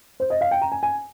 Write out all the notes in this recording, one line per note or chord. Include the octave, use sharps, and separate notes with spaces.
C5
D#5
F5
G5
A#5
G#5
G#5